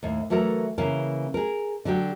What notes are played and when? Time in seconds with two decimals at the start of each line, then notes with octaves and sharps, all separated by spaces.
0.03 D#2 A2
0.30 E3 F#3 A3 A4 A#4
0.78 C#3 E3 A#3 C#4 A#4
1.34 G#4 A#4
1.85 D3 F#3 F#4 G4